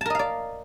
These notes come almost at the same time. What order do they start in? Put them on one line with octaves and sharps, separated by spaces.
A5 A#4 D#5 F5 D5